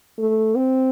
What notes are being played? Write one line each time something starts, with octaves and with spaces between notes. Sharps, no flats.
A3
C4